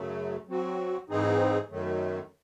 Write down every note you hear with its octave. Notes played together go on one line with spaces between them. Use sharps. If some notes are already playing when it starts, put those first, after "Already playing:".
Already playing: F#2 C#3 F#3 A3
F#3 C4 F#4
G#2 E3 C4 D#4 G#4
F#2 D#3 F#3 A3